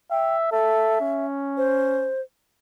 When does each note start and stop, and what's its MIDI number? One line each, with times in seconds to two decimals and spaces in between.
0.11 0.49 76
0.11 0.36 79
0.52 0.96 69
0.52 1.26 76
1.01 2.11 61
1.57 2.21 72